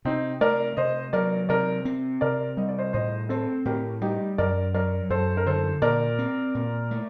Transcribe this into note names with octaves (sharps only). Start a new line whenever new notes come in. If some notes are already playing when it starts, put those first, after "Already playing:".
C3 C4 D#4
A3 A#4 D5
C3 C5 D#5
F#3 A#4 D5
C3 A#4 D5
C4
C3 A#4 D5
G3 D#5
D5
C5 D#5
A2 C5 D#5
C4 A4 C5
A2 G4 A#4
G3 D#4 G4
F#2 A#4 D5
F#3 A#4 D5
F#2 A4 C5
A#4
D3 A4 C5
A#2 A#4 D5
C4
A#2
A3